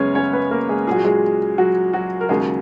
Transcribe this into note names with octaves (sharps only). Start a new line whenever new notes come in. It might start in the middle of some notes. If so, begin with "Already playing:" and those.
Already playing: F#2 C#3 G#3 B3 C#4 C#5
C#4 C#5
B3 B4
A#3 A#4
G#3 G#4
A#2 F#3 F#4 G#4
G#3 G#4
F#3 F#4
F#3 F#4
A#4
D#2 C#3 F#3 G#3 G#4